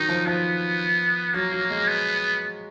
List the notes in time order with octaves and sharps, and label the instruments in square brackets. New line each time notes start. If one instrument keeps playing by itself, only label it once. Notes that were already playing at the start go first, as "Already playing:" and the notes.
Already playing: [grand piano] D#3 F#3 [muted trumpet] D#4
[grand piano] F3
[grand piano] F3 [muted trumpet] B3
[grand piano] F#3 [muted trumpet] A#3
[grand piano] F#3
G#3
[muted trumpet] B3